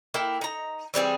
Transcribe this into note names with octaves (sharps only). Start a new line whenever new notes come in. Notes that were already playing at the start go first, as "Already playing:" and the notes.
A#3 E4 G5
D#4 A#5
E3 G3 C4 G#4